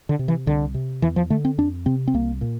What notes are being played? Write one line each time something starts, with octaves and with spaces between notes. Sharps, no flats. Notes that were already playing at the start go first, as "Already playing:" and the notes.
D3
C3
E3
C2 D3
C3
E2 E3
F3
D3 A3
C4
F2 D4
C3 C4
C4
C2 A#3
A#2